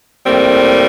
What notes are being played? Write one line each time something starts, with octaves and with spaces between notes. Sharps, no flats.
A2 G3 A#3 C4